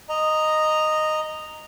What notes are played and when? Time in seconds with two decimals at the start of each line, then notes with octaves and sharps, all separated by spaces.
0.09 D#5 A#5